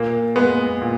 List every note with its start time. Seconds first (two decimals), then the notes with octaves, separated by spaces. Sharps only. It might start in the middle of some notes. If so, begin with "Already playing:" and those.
Already playing: A#2 A#3
0.36 G#3 B3
0.81 A#2